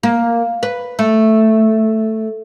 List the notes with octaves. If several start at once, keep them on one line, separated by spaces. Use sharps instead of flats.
A#3
B4
A3